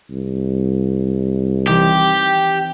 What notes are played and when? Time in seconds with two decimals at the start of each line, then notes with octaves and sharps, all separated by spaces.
0.11 C2
1.68 E3 C4 D#4 G4